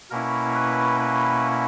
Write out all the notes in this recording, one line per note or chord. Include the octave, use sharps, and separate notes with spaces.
B2 A#3 C#4 E4 A#4
B4
B4